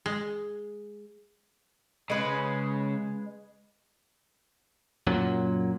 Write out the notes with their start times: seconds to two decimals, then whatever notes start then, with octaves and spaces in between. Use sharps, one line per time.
0.06 G#3
2.10 C#3 G#3 B4
5.07 F#2 A#2 F#3